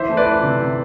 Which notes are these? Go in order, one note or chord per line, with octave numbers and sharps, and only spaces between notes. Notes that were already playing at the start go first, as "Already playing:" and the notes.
Already playing: E3 C5 E5
A3
B4 D5
E3
C3
C3